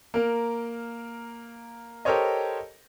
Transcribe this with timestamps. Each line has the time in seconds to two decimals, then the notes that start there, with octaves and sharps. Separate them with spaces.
0.14 A#3 A#4
2.05 G4 A4 A#4 C5 C#5 D#5